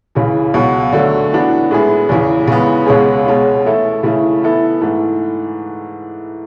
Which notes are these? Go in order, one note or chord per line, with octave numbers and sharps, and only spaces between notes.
C#2 C#3 E3
C#2 B2 F#3
D3 F#3 A3
E3 B3 D4 F#4
A2 G#3 B3 E4 G#4
E2 C#3 E3
C#3 E3 G#3 B3
C#2 B2 G#3 C#4 G#4
B2 G#3 C#4
E3 A3 E4 A4
C#3 E3 A3 E4
E3 B3 E4 A4
G#2 E3 A3